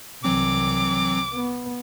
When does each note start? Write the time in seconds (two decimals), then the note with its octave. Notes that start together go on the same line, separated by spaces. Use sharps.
0.24 C2 E3 F#3 C4 D6
1.33 B3